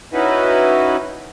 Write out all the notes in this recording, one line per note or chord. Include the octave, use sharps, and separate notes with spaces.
C#4 D#4 E4 F#4 B4